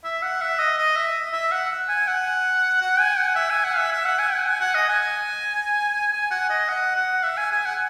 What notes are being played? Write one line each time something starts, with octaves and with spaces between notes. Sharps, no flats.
E5
F#5
E5
D#5
D#5
E5
E5
F#5
G#5
F#5
F#5
G#5
F#5
E5
G#5
F#5
E5
E5
F#5
G#5
F#5
G#5
F#5
D#5
G#5
G#5
F#5
D#5
F#5
F#5
E5
G#5
G#5
F#5